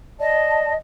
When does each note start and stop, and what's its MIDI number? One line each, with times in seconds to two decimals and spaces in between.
0.19 0.72 74
0.19 0.72 75
0.19 0.72 81